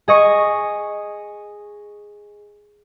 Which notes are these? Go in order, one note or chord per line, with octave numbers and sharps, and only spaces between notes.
G#4 D#5 C#6